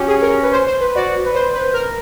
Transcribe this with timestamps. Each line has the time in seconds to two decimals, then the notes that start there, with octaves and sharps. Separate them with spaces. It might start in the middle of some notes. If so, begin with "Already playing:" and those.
Already playing: C#4 F#4 G4
0.08 G#4
0.22 A#4
0.43 B4
0.52 C5
0.67 C5
0.81 B4
0.96 F#4 D5
1.25 B4
1.35 C5
1.54 B4 C5
1.74 A#4